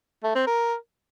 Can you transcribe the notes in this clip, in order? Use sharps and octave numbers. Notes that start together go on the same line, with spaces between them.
A3
C4
A#4